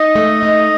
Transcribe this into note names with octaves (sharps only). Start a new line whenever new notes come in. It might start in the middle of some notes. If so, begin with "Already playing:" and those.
Already playing: D#4 D#5
A3
D#4